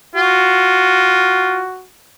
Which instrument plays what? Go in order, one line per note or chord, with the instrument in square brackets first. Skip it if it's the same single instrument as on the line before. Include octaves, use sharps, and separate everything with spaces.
[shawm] F4 [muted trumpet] F#4